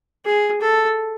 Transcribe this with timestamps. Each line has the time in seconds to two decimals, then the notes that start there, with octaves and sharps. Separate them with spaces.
0.25 G#4
0.61 A4